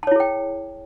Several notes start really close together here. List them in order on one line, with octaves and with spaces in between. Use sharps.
A5 C#5 E4 G#4 G5